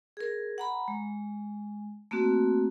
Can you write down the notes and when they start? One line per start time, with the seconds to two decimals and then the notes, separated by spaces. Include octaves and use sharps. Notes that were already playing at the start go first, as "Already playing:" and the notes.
0.17 G#4 A#4
0.58 F#5 A#5 B5
0.88 G#3
2.11 A3 A#3 C4 F#4